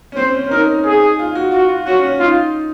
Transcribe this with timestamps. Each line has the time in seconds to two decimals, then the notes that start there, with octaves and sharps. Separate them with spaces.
0.12 C#4
0.17 C4 C5
0.34 C#4
0.44 C#4
0.51 D#4 A#4
0.85 G#4
1.19 F4
1.35 F#4
1.52 F4 F#4
1.69 F4
1.86 C#4 F#4
2.03 C#4
2.19 D#4 F4